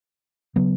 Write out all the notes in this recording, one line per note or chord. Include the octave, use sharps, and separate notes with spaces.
C#3 F#3 B3